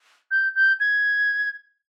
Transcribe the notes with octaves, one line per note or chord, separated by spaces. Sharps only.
G6
G6
G#6